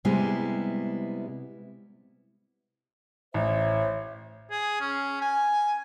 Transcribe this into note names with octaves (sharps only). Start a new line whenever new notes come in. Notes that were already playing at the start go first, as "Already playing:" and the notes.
C3 G3 G#3 B3 E4
A1 C5 C#5 E5
G#4
C#4
G#5